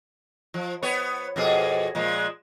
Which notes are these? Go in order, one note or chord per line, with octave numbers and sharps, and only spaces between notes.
F3
B3 C#5
F2 B2 G#4
A#2 F3 G#3